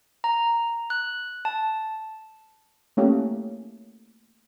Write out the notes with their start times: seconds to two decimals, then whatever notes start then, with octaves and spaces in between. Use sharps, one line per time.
0.24 A#5
0.90 F#6
1.45 A5
2.97 A3 A#3 C#4 G4 A4